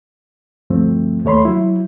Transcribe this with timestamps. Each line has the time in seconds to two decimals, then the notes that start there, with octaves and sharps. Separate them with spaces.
0.70 D2 G2 F3 A3 C4
1.25 D#2 A3 C#5 B5 C6
1.45 F#3 E4